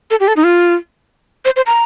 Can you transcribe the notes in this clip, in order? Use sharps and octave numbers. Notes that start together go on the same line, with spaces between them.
A4
G4
A4
D#4
F4
C5
C5
A#5